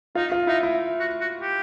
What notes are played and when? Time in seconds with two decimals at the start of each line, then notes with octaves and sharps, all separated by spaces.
0.15 D#4 F4
0.32 F4
0.47 D#4 E4
0.63 E4
1.00 F#4
1.21 F#4
1.41 G4